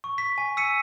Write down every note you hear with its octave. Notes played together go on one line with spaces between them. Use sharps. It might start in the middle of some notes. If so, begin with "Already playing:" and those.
C#6
B6
G#5
E6 B6 C#7 D#7